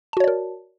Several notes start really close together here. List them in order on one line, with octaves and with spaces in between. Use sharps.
A5 F#4 C#5 D5 A#4